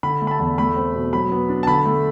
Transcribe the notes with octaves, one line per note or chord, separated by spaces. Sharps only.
D3 B5
A3
B5
A5
E2
A3 B5
C4
B2
F#3 B5
B3
D4
A5
D3 B5
A3